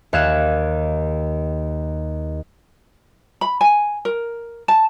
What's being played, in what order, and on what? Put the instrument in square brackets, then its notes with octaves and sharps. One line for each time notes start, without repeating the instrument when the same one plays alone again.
[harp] D#2 F5 F#6 G#6 E7
[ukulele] B5
G#5
A#4
A5